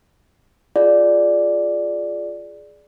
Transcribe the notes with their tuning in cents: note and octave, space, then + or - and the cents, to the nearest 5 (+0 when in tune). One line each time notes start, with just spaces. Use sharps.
F4 +0 G#4 +15 D5 +0